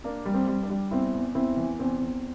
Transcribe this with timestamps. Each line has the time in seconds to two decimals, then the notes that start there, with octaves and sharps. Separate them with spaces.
0.04 A#3 D4
0.26 G3
0.34 C4
0.48 G3
0.63 D4
0.70 G3
0.91 E2 C4 E4
1.14 E2
1.35 E2 C4 E4
1.57 E3
1.79 E2 C4
2.01 E2